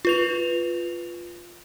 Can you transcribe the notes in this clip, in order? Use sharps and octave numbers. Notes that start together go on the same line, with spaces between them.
F4 B4 F7